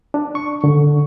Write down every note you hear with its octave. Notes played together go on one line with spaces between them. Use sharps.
D4
C#6
D3